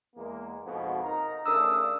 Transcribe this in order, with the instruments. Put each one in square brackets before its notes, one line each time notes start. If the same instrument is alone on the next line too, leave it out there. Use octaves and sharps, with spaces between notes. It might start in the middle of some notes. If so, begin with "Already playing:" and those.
[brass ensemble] E2 G#3 A#3
F2 G#2 B2
D#4 A#4 A#5
[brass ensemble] C#3 A3 D4 [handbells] A#4 D#6 E6